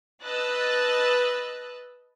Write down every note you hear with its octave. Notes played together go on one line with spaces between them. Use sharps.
B4 D#5 A5 E6 F#6 A6